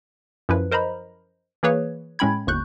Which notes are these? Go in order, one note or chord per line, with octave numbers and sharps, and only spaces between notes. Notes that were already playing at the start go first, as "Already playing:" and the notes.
F#2 F3 E4 B4
A#4 C5 D#5 A#5 B5
E3 A#3 G#4 B4 C#5
A2 G#3 C#4 G5 B5 G#6
G1 D#2 C#6 F#6 G6